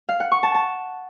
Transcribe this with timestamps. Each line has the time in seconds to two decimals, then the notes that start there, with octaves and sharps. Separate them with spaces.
0.09 F5
0.20 F#5
0.32 C#6
0.43 A5
0.54 A5